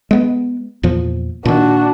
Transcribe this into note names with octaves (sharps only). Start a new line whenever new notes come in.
G#3 B3
E2 A#2 F3
A#2 D#3 D4 F#4